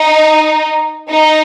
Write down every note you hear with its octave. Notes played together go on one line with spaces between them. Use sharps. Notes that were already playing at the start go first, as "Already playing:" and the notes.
Already playing: D#4
D#4